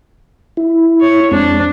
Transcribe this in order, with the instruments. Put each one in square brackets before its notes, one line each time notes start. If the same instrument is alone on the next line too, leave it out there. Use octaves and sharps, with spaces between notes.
[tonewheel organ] E4
[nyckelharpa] C#5
[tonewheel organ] F2 G#3 C4 [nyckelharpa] D4